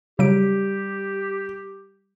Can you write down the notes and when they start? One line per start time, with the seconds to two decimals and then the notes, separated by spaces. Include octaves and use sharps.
0.19 C#3 F#3 G3 G4 D7